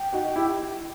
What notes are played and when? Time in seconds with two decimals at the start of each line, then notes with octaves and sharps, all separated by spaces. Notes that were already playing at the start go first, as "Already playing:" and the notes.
Already playing: G5
0.13 D#4 F#4
0.36 E4 G4